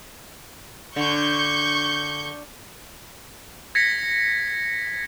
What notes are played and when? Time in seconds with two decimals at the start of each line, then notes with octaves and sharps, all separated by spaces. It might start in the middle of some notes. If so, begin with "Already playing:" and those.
0.96 D3 C#6 G6
3.75 G#6 A#6 B6 C#7